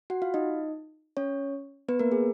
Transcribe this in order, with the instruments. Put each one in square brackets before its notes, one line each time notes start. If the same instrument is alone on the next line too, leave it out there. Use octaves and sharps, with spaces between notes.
[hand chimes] F#4 F#5
F4 F5
D#4 D#5
C#4 C#5
B3 B4
A#3 A#4
G#4